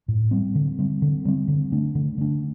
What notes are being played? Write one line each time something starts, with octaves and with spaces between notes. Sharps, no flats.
A2
G3 C4
D3
G3 C4
D3
G3 C4
D3
A3 D4
D3
A3 D4